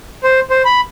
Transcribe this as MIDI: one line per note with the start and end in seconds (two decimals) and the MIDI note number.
0.24 0.40 72
0.50 0.62 72
0.65 0.81 83